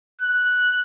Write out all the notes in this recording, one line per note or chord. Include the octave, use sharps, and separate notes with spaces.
F#6